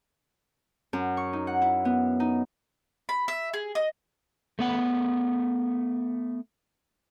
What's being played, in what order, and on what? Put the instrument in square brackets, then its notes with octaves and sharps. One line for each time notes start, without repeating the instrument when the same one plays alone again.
[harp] F#2
C#6
D#4
F#5
E4
B3
D#4
[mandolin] B5
E5
G#4
D#5
[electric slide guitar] A3 B3 F#5